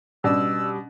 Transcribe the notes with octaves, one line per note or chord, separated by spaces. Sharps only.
B2 G3 C#4 D4 D5 E6